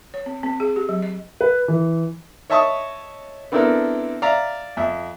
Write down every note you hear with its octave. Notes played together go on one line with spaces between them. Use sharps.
C#5
C4
C4
G#4
G4
F#3
D#5
B4
E3
C#5 D#5 E5 A5 C#6 D#6
B3 C4 D4 E4 A4 A#4
D5 E5 F5 A#5
F2 E5